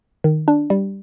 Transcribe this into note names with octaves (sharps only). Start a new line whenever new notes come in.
D#3
D4
G3